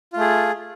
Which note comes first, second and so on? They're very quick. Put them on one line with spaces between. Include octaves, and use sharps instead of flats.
F4 A3 G#4